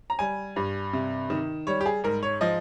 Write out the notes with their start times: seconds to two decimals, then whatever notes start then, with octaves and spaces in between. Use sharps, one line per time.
0.10 A#5
0.19 G3 G#5
0.56 G2
0.93 C3
1.30 D#3
1.67 G3 C#5
1.81 G4
1.86 G#4
2.04 G#2 A#4
2.23 C#5
2.41 F3 D#5